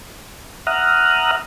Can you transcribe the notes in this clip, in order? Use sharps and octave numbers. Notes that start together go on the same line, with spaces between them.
E5 F#5 A#5 D#6 F6 F#6